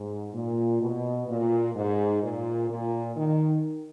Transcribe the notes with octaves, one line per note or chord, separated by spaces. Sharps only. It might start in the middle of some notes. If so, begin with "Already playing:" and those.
Already playing: G#2
A#2
B2
A#2
G#2
A#2
A#2
D#3